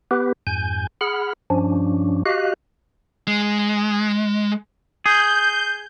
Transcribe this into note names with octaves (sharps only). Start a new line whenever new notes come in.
B3 G4 B4
F2 G#2 G#5 G6
G#4 F#5 B5 F6
G2 F3 C#4 D4
F#4 G4 D#5 F5 F#6
G#3
G#4 G6